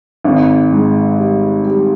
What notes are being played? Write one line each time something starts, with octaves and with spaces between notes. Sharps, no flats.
G#1
G#2
G3
G3